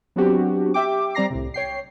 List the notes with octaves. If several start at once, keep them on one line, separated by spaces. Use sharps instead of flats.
F#3 B3 C4 D4 F#4 G4
G4 E5 G5 D6
G3 C4 D5 A#5 A#6 C7
C2 A2 C3
C#5 G5 C7